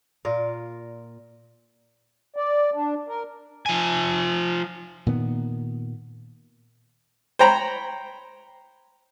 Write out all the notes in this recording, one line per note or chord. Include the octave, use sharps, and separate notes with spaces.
A#2 F4 A#4
D5
D4
A#4
F3 G#5
A#2 D#3 B3
C5 C#5 G5 A#5 B5